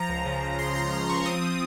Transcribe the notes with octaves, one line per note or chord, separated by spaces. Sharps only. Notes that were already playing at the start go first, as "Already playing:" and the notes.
Already playing: F3 A#5
C#2
C#3
C#2
C#2 C6
C#2 A#5
C#3 C6
F3 C#6
C4 D#6
C4